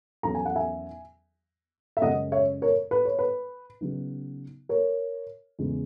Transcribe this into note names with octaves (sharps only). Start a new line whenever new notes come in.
E2 D#3 F#3 C#4 A#5
G#5
F#5
E5 G#5
E5
F#2 C#3 G#3 C#4 D#5 F#5
C#5 E5
A#4 C#5
B4
C#5
B4
C#3 F#3 B3 D#4
A#4 C#5
E2 C#3 G#3